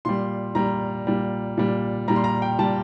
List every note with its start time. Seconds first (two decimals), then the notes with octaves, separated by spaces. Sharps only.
0.05 A#2 G3 C6
0.55 A#2 G3 A#5
1.07 A#2 G3
1.58 A#2 G3
2.08 A#2 G3 A#5
2.16 C6
2.24 A#5
2.42 G5
2.59 A#2 G3 A5